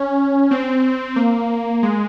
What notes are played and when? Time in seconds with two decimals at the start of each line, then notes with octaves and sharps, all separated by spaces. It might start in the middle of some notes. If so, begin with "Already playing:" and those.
Already playing: C#4
0.51 C4
1.16 A#3
1.83 G#3